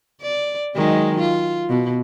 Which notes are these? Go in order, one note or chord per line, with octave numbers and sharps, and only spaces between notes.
D5
D#3 F#3 G#3
F4
B2